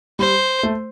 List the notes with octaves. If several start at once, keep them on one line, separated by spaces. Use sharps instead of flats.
G3 C5
A3